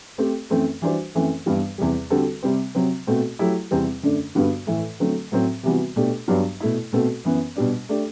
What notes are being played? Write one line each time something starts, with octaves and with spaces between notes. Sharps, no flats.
A3 C4 G4
F#2 E3 A3 C4
E3 G3 D4 F#4 C5
F#2 E3 A3 C4
G2 E3 G3 B3
E2 C3 G3
D3 G3 C4 F#4 A4
C3 G3 C4
C3 F#3 C4
B2 A3 C4 F#4
F#3 A3 E4 G4
E2 C3 G3 C4
F#2 D3 A3 D4
G2 D3 G3 B3 F#4
A2 E3 A3
D3 F#3 A3 C4
A2 F#3 C4
C3 E3 G3 B3 F#4
B2 A3 D4 G4
G2 F#3 B3 D4 G4
B2 A3 E4
B2 A3 C4 F#4 A4
F#2 E3 B3
B2 G3 D4
A3 D4 G4